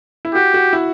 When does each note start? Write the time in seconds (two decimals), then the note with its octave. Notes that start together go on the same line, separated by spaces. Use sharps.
0.25 E4
0.34 F#4 G4
0.54 F#4
0.73 E4